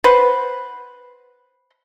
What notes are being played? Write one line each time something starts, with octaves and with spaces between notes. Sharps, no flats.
B4 C5 F#5